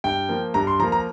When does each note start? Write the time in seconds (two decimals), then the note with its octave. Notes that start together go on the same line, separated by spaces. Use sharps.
0.04 G2 G5
0.29 F3 A#3
0.54 G2 A#5
0.67 C6
0.79 F3 A#5
0.83 A#3
0.92 A#5